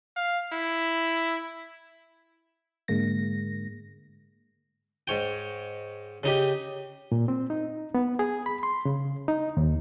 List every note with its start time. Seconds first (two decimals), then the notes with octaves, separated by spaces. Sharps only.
0.16 F5
0.53 E4
2.88 G#2 D3 G#3 A#3 A#6
5.08 G#2 C#5 G5
6.23 C#3 D#4 G4
7.12 A#2
7.28 C4
7.50 D#4
7.95 B3
8.19 G#4
8.46 B5
8.63 C6
8.85 C#3
9.28 D#4
9.57 D#2